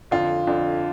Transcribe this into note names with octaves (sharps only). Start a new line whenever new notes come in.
F2 D3 F4
F2 D3